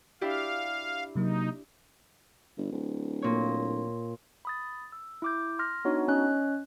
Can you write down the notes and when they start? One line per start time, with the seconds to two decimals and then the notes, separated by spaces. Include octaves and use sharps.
0.21 D4 E4 G4 F5
1.15 C3 F#3 A#3 D#4
2.57 G1
2.72 D1
3.22 A#2 C#5
4.45 B5 D#6 A6
4.92 E6
5.22 E4 D6 G6
5.59 C6 F6 A#6
5.85 B3 D4 D#4 F#4 C#5
6.08 C#4 C#5 D#5 F#6